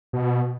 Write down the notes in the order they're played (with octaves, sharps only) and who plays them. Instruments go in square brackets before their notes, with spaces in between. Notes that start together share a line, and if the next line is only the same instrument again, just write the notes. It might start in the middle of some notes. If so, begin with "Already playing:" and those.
[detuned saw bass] B2